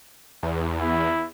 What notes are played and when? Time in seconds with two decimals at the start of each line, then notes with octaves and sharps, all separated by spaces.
0.43 E2
0.80 E4